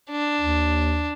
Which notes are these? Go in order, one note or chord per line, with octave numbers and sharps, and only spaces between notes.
D4
D#2